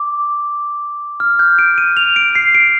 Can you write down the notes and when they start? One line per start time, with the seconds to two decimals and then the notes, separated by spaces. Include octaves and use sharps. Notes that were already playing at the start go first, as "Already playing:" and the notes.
Already playing: D6
1.20 F6
1.39 G6
1.59 D7
1.78 D#7
1.97 F7
2.16 D7
2.35 C7
2.55 D7